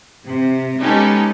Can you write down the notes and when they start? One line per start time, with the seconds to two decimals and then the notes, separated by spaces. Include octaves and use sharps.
0.24 C3
0.79 G#3 B3 C#4 D#4 G4 A4